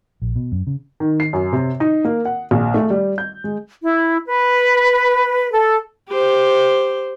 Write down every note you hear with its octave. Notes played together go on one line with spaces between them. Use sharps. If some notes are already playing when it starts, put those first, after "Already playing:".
A#1
B2
F#2
C#3
D#3
C7
F#2
C3
D#4
A#3
F#5
A#1
A3
G3
G6
G#3
E4
B4
A4
G4 C5